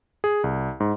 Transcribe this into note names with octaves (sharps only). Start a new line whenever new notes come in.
G#4
C2
G#2